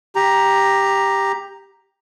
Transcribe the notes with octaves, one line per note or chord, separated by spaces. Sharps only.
G4 A#5